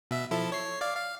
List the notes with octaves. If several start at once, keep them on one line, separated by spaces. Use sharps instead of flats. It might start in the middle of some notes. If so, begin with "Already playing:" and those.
B2 E5
F3 E4 A4
C#5 C7
D5 F5
F5